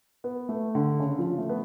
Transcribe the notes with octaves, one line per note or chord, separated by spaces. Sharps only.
B3
A3
D3
C#3
F3
A3
B3